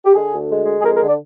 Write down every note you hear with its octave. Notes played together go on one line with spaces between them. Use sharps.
G4
D3 G#4
D2
G#3
G#3
G#4
F2 A#4
A#4
D3
D5